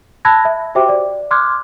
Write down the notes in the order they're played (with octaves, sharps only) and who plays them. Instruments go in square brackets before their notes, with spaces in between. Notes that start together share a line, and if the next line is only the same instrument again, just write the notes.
[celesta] A5 B5 E6 F#6 G#6 A#6
E5
F#4 G4 C5 E5 G5 D6
D5
C6 D6 F6 F#6 G#6